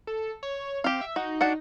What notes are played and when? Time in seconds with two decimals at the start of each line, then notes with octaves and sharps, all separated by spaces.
0.07 A4
0.43 C#5
0.84 C4 G4 F5
1.01 E5
1.16 D#4 F#4
1.41 D4 F#4 F#5